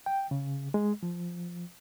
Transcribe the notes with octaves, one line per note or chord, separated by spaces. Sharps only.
G5
C#3
G#3
F3